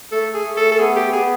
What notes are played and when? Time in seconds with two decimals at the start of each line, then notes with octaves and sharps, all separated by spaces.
0.12 A3 A4
0.34 G#4
0.46 A3
0.57 A4
0.72 A4
0.79 B3 G#4
0.96 G4
1.13 B3 G#4